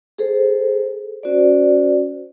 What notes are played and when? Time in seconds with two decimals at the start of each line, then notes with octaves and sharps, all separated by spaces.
0.18 G#4 A4 C5
1.23 C#4 F#4 C5 D5